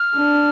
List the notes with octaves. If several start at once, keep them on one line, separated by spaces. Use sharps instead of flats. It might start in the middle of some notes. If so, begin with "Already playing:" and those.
Already playing: F6
D4